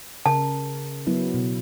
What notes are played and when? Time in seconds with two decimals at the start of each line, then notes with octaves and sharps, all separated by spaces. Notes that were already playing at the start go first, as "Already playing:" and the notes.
0.26 C#3 A#4 A5
1.07 F#3 B3 E4
1.34 B2